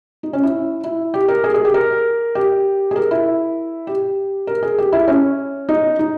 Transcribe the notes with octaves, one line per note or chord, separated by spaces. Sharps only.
D#4
C#4
E4
E4
G4
A#4
G#4
G#4
G4
A#4
G4
G#4
A#4
E4
G4
A#4
G#4
G4
E4
C#4
D#4
D#4